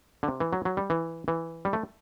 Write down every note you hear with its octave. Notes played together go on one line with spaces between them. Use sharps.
D3
C3
E3
F#3
F#3
G3
E3
E3
G3
A3